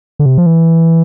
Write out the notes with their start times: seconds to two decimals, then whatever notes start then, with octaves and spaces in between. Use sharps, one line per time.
0.19 D3
0.26 C3
0.38 F3
0.46 E3